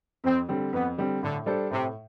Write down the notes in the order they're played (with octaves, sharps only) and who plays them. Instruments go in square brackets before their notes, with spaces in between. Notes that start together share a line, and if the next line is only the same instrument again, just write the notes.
[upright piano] F2 [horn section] C4
[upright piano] D3 G3 C4
[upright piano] F2 [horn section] B3
[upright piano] D3 G3 C4
[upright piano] A2 [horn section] D3
[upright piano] G3 D4 A4 C5
[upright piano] A2 [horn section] C3